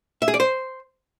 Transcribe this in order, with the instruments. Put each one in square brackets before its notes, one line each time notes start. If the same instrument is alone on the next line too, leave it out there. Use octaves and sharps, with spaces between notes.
[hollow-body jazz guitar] E5
G#4
D5
C5